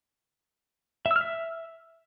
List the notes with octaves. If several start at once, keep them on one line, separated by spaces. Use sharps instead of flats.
E5
E6
F6
E5